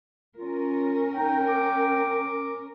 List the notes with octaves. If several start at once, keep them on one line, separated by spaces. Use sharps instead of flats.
C#4 F4 A#4
D#4 G5
D6